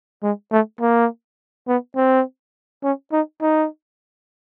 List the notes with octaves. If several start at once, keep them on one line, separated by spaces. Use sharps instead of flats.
G#3
A3
A#3
B3
C4
C#4
D#4
D#4